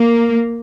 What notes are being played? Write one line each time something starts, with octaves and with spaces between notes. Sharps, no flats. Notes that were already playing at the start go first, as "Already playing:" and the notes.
Already playing: A#3